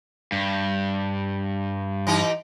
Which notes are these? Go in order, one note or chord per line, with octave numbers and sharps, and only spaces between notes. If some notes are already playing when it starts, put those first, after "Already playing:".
G2
E3 D#4 G4